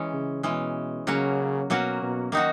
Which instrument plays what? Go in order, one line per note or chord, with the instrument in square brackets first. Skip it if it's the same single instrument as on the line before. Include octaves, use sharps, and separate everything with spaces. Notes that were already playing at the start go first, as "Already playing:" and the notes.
Already playing: [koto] E3 G#3 C#4
[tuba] C#3
[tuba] B2 [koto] E3 G#3 C#4
[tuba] C#3 [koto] F#3 A#3 C#4 F#4
[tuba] B2 [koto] F#3 A#3 C#4 F#4
[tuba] B2
[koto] D#3 A#3 D#4 F#4